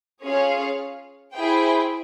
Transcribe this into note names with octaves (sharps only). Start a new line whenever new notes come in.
C#4 F4 G#4 C#5 F5
E4 G#4 C5 G5